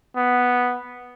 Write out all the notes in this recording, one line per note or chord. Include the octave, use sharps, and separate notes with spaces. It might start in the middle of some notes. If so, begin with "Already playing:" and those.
B3